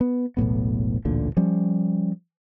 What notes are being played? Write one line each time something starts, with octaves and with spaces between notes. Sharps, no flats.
B3
E1 B1 A2 B3
A1 D2 A#2 D3
F3 G3 C#4